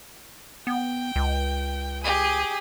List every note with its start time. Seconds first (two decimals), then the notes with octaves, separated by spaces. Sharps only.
0.67 B3 G5
1.16 C#2
2.03 G4 G#4